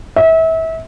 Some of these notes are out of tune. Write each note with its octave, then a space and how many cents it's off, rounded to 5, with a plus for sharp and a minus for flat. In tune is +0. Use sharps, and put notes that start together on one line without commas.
E5 -30